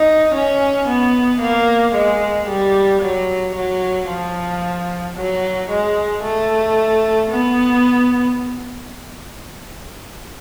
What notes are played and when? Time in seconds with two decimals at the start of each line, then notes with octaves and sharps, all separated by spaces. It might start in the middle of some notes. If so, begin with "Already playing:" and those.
Already playing: D#4
0.34 C#4
0.88 B3
1.41 A#3
1.95 G#3
2.48 G3
3.02 F#3
3.55 F#3
4.09 F3
5.16 F#3
5.70 G#3
6.23 A3
7.30 B3